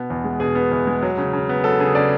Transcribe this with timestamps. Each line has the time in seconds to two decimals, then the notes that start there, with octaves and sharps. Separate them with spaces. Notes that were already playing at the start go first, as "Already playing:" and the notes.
Already playing: B2 B3
0.10 E2
0.24 G#3
0.40 B2 G#4
0.55 B3
0.71 E2
0.87 G#3
1.03 F#3
1.18 C#3
1.33 C#3
1.49 B3
1.64 F#3 A4
1.80 C#3 G#4
1.95 C#3 D5